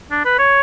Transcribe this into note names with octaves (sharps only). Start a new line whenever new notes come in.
D4
B4
C#5